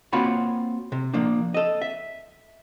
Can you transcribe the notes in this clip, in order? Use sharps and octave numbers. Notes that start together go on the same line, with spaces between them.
A#3 C4 F4 F#4 C#5 B5
C3
F3 A#3 D4
A4 D#5
E5